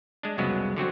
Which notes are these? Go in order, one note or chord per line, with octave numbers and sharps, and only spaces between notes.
G#3 D4
C2 F2 C#3 F#3 G#3 B3
D3 F#3 C4 F#4